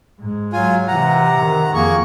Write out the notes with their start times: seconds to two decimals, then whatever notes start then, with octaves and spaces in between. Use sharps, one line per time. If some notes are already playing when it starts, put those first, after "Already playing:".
0.19 G#2 G#3
0.53 F#3 F4 G#5
0.88 C3 E3 F#5 A#5
1.39 D#3
1.74 F2 A#3 G#4 C#6